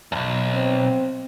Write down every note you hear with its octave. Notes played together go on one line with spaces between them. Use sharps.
B1 E2
C4